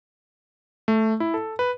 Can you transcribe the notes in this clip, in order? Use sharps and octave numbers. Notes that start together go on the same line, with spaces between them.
A3
E4
A4
B4